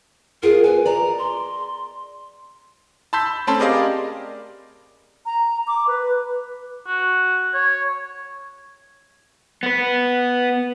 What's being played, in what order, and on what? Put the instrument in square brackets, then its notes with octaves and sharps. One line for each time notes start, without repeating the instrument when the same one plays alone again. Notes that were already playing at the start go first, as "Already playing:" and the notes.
[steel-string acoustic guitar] B3 F4 G#4 [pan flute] A#4
[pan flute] B4 [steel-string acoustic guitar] G#5
[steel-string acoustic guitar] D5 D#5 [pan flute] A#5
[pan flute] C6
[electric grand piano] A5 B5 C6 E6 G6 B6
A3 C4 C#4 A5 B5 C6
G4 G#4 A#4 D5 D#5 F5
[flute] A#5
D6
B4
[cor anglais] F#4
C#5
[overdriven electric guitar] B3 B4